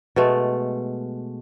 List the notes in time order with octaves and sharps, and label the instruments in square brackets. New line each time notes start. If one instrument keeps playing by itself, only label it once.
[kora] B2 G#3 A3